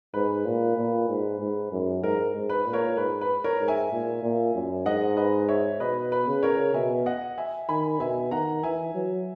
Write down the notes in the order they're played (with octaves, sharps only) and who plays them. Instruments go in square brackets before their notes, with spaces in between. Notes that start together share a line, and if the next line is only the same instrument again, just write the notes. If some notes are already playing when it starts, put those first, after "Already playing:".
[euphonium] G#2 [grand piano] B4
[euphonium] A#2
A#2
G#2
G#2
F#2
[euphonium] G#2 [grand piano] A#4
[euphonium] G#2
[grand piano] B4
[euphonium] A#2
[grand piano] A#4 C#5
[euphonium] G#2 [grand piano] B4
[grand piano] B4
A#4 C#5
[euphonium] G#2
[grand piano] E5 G#5
[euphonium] A#2
A#2
F#2
[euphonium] G#2 [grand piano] D#5 F#5
[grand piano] B4 D#5
C#5 E5
[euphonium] B2 [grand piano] B4 D#5
[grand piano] B4
[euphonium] C#3
[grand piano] A#4 C#5
[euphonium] B2 [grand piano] E5 G#5
[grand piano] D#5 F#5
E5 G#5
[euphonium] D#3 [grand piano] G#5 B5
[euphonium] B2 [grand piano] E5 G#5
[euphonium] D#3 [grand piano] F#5 A#5
[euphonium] E3 [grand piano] E5 G#5
[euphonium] F#3